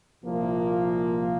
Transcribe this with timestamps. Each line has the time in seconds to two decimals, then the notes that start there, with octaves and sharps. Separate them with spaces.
0.24 C2 A#2 F3 A#3